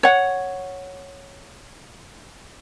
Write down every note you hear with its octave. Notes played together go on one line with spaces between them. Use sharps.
C#5 F#5